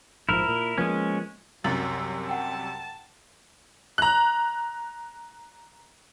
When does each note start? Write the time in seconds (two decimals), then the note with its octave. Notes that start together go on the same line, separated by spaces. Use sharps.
0.29 A#1 G#2 F3 E4 A#4
0.49 A#2
0.78 F3 G#3 A#3 B3 C#4
1.64 C2 F#2 C3 F#3 A6 F#7
2.29 F#5 G5 A5
3.98 A#5 F#6